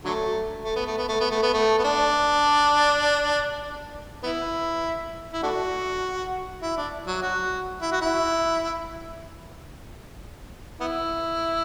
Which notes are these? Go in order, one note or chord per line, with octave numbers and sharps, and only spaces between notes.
D3 F#3 A3
A3
B3
A3
B3
A3
B3
A3
B3
A3
B3
D4
B3 E4
E4
A3 D4 F#4
E4
D4
F#3
F#4
E4
F#4
E4
B3 E4